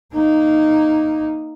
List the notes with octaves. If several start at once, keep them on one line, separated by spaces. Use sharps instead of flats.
A#3 D#4